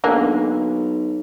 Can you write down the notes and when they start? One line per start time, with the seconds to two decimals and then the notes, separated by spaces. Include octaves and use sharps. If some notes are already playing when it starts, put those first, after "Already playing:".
0.04 B1 D3 G#3 A#3